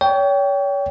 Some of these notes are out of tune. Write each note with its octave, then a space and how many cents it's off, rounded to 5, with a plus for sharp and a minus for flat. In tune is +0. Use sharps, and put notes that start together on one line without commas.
C#5 +35 G5 -5